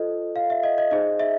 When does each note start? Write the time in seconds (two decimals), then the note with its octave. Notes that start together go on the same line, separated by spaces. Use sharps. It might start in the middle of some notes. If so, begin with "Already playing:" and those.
Already playing: F4 A4 C5 D#5
0.36 F5
0.50 E5
0.63 D#5
0.78 D#5
0.91 D#4 G#4 C5 D#5
1.20 E5